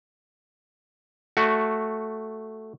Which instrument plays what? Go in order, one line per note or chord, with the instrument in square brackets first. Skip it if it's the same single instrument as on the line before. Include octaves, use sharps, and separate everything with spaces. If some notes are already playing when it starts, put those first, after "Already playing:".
[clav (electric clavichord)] A3 F#4